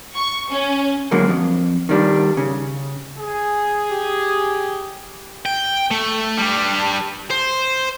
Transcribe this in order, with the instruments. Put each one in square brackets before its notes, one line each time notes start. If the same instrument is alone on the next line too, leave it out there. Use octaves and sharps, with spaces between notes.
[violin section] C#6
C#4
[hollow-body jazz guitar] F#2 D3 F#3 G#3 A#3
F2
D#3 G3 D4
C#3
[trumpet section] G#4
[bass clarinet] G4
[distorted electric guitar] G5
A3
G3 D4
C5